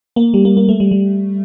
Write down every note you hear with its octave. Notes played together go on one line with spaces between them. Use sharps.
A#3
G3
A#3
A#3
A3
G3
G3